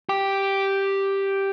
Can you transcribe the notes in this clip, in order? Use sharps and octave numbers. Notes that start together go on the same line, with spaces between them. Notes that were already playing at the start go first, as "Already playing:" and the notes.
G4